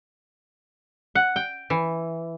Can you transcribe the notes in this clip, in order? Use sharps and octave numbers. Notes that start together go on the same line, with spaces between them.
F#5
G5
E3